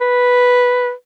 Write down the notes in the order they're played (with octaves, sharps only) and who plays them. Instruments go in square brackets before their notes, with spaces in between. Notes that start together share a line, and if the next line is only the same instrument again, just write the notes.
[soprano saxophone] B4